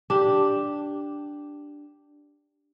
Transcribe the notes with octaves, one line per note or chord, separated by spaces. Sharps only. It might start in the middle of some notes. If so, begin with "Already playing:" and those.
D4 G4